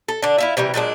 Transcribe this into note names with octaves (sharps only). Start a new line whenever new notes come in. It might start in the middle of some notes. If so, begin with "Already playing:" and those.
A4
D3 D4
E4 F4 E5
C3 E3 G3 A#3
A#2 F#3 G#3 D4